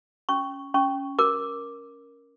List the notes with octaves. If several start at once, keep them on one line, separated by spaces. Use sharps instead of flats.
C#4 C#6
C#4 C#6
A#4 D6